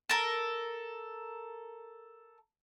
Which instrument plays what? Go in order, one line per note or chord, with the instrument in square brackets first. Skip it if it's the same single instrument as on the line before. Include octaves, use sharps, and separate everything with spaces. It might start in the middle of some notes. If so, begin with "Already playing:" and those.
[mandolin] A4 A#4